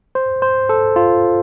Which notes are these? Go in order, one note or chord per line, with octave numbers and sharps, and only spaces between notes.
C5
C5
A4
F4